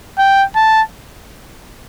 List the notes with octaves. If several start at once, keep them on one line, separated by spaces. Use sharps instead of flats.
G5
A5